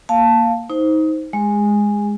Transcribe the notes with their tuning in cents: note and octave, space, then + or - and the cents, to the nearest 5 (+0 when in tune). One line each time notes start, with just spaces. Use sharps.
A#3 +0 F5 +0 A5 +0
D#4 +25 C5 +0
G#3 -5 G#4 -35